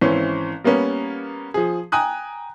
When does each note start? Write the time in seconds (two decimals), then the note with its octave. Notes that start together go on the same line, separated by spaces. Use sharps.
0.01 G#1 E3 C4 C#4
0.64 G3 A#3 B3 C#4
1.54 F3 G#4
1.92 G5 G#5 A#5 D#6 F#6